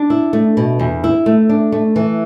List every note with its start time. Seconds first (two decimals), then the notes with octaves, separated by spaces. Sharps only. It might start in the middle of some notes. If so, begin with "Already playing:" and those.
Already playing: D4
0.10 E4
0.33 A3
0.57 B2
0.79 E2
1.04 E4
1.26 A3
1.49 D4
1.72 A3
1.96 E3